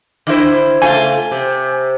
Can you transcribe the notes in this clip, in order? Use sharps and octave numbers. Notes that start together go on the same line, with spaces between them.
D3 E4 C5
C#3 A3 F4 G#5
C3